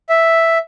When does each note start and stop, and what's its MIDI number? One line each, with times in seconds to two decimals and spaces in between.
0.09 0.58 76